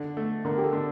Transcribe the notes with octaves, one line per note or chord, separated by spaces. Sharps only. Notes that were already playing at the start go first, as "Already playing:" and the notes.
Already playing: D3
A3
D3 A#4
G4
A4
D3